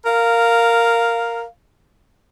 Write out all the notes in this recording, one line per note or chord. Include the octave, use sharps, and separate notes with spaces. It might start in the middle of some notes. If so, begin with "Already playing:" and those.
A#4 F5